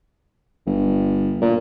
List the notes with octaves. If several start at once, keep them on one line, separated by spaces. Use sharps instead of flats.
G1
A#2